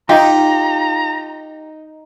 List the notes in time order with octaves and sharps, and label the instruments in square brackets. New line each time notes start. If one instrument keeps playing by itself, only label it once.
[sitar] D#4 [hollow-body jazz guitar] F4 [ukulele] G4 [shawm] A#5